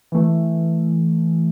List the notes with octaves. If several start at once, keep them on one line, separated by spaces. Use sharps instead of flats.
E3 A3